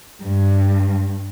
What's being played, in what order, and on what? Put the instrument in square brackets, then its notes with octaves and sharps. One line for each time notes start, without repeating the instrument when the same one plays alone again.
[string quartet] G2